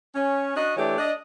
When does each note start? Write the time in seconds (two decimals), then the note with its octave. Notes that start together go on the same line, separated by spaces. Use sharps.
0.15 C#4
0.56 D4 F#4 D#5
0.77 E3 A3 D4 G4 C#5
0.98 D4 D#5